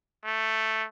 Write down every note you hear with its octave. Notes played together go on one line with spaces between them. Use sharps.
A3